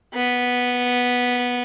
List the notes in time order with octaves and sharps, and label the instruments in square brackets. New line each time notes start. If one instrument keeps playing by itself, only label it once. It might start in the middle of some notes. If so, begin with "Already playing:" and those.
[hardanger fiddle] B3